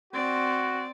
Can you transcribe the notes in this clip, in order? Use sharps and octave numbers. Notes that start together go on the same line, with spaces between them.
C4 F#4 D5